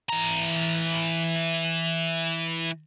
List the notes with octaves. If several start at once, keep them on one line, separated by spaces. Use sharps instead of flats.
E3 A#5